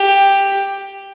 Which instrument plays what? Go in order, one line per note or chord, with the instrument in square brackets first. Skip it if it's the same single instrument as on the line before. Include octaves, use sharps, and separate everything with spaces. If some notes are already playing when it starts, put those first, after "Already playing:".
Already playing: [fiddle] G4